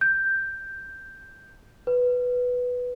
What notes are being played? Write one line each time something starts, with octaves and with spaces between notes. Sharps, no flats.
G6
B4